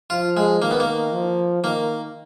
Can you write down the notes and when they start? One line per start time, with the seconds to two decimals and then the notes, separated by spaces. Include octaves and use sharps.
0.10 F3 F4
0.37 G#3
0.62 D#3 A#3
0.71 B3
0.80 A#3
1.13 F3
1.64 D#3 A#3